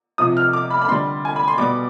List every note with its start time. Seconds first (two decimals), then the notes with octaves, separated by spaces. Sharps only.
0.18 C3 F3 D#6
0.37 F6
0.53 D6
0.70 B5
0.82 B5
0.88 D3 G3 C6
1.25 G#5
1.36 B5
1.48 C6
1.57 B2 G3 D6